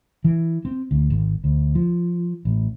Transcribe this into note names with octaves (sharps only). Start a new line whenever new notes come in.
E3
C4
D2
G#1
D2
F3
A1